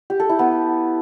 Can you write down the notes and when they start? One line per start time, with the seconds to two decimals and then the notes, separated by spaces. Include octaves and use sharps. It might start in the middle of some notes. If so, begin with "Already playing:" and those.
0.10 G4
0.20 A4
0.29 E4
0.39 B3